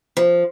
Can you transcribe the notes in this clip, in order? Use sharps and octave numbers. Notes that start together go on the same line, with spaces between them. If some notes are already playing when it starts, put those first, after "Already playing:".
F3